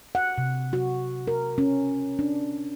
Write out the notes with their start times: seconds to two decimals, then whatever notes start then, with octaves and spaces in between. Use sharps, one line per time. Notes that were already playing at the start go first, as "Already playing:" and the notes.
0.15 F#5
0.38 C3
0.73 F#4
1.27 A#4
1.58 C#4
2.19 D4